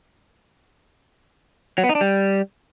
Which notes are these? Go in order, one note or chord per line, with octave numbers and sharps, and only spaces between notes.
F#3
B3
D#4
D4
G3